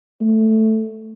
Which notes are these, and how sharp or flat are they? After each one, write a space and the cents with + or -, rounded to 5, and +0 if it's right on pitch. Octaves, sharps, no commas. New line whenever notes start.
A3 +0